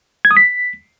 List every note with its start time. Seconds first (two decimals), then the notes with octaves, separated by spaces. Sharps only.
0.25 G#6
0.31 D#6
0.37 B6